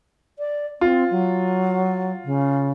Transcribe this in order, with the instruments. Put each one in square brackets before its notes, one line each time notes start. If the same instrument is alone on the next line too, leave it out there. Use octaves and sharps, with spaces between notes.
[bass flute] D5
[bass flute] C4 [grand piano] F4
[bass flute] F#3
C#3